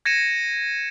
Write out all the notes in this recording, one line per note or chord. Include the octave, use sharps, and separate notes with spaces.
G#6 A#6 C#7 D#7 E7